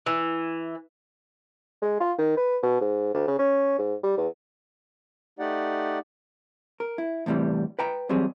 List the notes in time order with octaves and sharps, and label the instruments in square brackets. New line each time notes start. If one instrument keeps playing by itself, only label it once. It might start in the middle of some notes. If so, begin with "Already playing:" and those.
[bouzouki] E3
[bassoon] G#3
F4
D#3
B4
B2
G#2
D2
C#3
C#4
G#2
G3
E2
[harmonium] A3 D#4 G4 D5 F#5
[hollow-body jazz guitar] A#4
E4
E2 A2 C3 E3 G3
B4 G5 A#5
E2 F#3 G3 C4 G#4